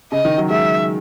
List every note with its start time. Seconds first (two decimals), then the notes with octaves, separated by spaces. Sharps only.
0.12 C#3 D#5
0.25 D#3
0.38 F#3
0.50 G#3 E5